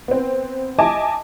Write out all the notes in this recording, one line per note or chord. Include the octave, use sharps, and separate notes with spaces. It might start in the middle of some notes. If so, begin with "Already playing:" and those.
B3 C4
D#5 E5 G#5 A5 D6